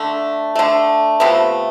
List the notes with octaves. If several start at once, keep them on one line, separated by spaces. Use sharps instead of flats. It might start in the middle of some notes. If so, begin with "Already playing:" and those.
Already playing: D3 A3
D3 A3
C3 F3 A3 B3